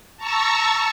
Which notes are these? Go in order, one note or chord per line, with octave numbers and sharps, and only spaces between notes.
A5 A#5 C#6 E6